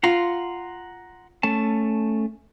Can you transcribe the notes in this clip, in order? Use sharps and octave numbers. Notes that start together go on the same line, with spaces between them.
F4 F#5 A#5 C6
A3 C#4 A5